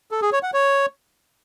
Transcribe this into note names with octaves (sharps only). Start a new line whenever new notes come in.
A4
G#4
C#5
F#5
C#5